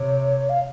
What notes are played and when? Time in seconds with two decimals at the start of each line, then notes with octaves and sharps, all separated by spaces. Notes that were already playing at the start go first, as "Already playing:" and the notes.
Already playing: C3 C#5
0.49 F5